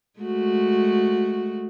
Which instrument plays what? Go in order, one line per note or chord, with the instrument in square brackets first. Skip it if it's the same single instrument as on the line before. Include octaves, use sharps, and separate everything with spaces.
[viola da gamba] G#3 A3 F#4